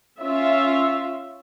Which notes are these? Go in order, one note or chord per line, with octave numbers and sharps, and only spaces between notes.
C#4 F4 E5